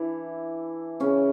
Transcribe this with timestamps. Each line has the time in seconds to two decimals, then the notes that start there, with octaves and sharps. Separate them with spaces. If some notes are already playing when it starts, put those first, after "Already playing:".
Already playing: E3 D4 E4
1.00 C#3 C#4